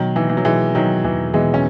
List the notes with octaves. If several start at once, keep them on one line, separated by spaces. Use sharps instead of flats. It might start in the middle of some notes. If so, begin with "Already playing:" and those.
Already playing: B2 D#3 F#3
E3 D#4
E3
F#3
B2 E3 G#3
D#3 F#3 D#4
E2 E3
B2 E3 G#3
C#4